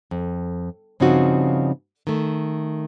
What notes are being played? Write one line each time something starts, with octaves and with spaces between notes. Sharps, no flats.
F2
G2 C#3 F3 C4 D#4 F#4
D#3 A3